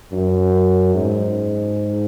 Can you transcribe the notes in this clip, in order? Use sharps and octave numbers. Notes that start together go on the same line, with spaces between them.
F#2
G#2